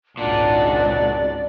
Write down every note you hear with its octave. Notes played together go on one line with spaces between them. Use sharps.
G#1 C#2 A#2 D4 F#4 D5